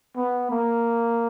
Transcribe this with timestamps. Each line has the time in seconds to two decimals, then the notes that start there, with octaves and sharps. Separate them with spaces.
0.17 B3
0.51 A#3